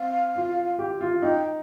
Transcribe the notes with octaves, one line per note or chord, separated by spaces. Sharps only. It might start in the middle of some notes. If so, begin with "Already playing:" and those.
Already playing: C4 F5
F4
G4
F4
D#4 G5